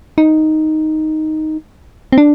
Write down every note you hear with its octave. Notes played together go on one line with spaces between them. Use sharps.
D#4
C4
D4